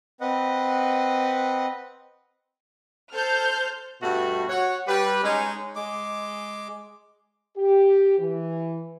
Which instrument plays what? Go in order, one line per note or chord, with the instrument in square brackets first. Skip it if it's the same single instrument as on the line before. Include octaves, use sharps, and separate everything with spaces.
[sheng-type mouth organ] C4 B4 D#5 F#5
[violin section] A4 C5 F6 G6
[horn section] G2 B2 A3 F#4
F#4 C#5 F#5
G3 G4 B4
G#3 C#4 D#4
[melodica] G#3 D6
[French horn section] G4
E3